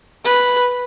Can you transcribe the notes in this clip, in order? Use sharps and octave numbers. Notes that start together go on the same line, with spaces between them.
B4